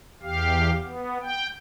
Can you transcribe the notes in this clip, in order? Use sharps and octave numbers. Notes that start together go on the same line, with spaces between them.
E2 G4 F5
B3
G5